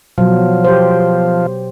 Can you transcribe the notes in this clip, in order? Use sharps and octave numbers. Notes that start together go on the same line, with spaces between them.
B2 F3 F#3
G4 C5